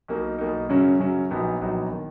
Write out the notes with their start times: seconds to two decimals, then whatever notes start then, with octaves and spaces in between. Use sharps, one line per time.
0.08 B1 B2 A#3 D#4
0.38 B1 B2 A#3 D#4
0.69 F#2 C#3 F#3 C#4
0.99 F#2 C#3 F#3 C#4
1.31 A#1 A#2 F#3 B3 D#4
1.61 A#1 A#2 F#3 B3 D#4
1.91 D#3